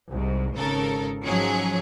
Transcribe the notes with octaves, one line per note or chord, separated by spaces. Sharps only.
C2 G#2
G#1 C#3 A4 A#4
G#2 F3 F#3 C#4 G#4